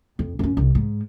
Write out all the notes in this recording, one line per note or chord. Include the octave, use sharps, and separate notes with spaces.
F2
F#2 C#4
C2
G#2